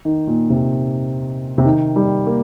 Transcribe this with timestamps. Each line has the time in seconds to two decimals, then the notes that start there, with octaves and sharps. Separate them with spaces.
0.05 D#3
0.27 A#2
0.50 C3
1.58 C3
1.65 D#3
1.96 G3
2.26 A#3